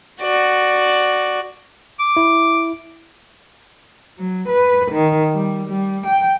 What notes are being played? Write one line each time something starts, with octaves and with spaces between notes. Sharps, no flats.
F#4 D5
D6
E4
F#3
B4
D#3
G3
G3
G5